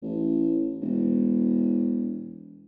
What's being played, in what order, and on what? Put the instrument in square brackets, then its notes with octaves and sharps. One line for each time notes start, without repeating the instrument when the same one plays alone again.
[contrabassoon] A1
E1